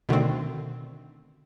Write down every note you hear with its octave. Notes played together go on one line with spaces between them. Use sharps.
B2 D3 D#3 A3 C4